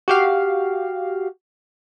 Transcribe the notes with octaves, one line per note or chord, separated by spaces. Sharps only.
F#4 G4 F5